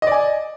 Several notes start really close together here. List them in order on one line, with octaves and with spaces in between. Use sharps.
D#5 D5 G#5